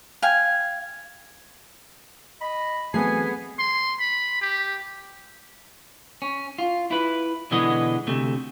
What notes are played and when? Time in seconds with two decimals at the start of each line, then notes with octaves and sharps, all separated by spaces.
0.22 F5 G5 G#5
2.41 D#5 B5
2.94 E3 F#3 A3 B3 C4 G#4 G#5 C7
3.59 C6
4.00 B5
4.41 G4
6.22 C#4
6.58 F4
6.91 E4 B4
7.51 B2 D3 E3 G#3 B3 D#5
8.07 D2 C3 A3